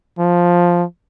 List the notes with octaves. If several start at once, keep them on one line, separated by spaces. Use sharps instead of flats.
F3